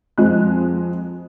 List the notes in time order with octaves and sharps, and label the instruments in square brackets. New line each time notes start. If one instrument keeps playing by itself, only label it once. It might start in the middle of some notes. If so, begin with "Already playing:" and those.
[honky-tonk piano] F2 F3 G#3 F#6